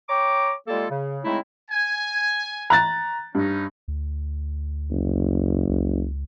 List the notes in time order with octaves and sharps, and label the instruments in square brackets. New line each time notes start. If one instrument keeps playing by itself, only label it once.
[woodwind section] C#5 G5 A#5 D6
G3 G#3 A#3 F4 A4
C#3
C#3 G#3 A3 C4 D#4 E4
[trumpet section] G#5
[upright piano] A#5 F#6 A6
[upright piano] G2 [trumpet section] C#4 D#4
[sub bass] D2
[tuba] F#1
[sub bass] C#2